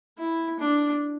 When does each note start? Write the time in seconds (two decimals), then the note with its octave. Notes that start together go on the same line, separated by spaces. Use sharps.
0.18 E4
0.60 D4